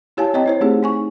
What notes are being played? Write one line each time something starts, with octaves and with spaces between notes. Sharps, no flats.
E4 G4 C#5 F5 G#5 A5
C4 C#5 D#5 G5 A#5
E4 C5 C#5
A3 C4 D#4 G4 G#4 C5
D#4 G#5 C#6